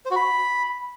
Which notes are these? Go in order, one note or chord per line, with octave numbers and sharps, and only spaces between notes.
C5
F#4
B5